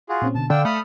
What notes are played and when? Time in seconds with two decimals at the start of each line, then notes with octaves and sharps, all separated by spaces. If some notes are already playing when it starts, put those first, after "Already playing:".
0.09 F4 F#4 G#4
0.22 A#2 C4 C#4
0.35 B2 D3 A5
0.50 D3 D5 F5 G5 E6
0.65 A3 B5 D#6 F6